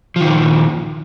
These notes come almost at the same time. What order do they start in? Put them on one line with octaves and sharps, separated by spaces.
F3 D#3 A#2